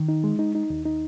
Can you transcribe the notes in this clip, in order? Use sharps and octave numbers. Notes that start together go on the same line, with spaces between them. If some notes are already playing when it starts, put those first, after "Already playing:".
Already playing: D#3
D#4
G#3
D#4
D#4
D#2
D#4